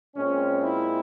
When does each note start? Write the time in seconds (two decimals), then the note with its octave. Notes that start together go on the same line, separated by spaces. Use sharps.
0.15 A#2 G#3 C4 C#4
0.63 E4